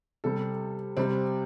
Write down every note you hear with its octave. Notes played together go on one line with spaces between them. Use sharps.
C3 G3 A4
C3 G3 C4